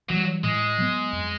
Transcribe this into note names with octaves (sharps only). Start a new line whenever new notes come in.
E3 F#3 G3
A2 G#3
F#3 B3
F2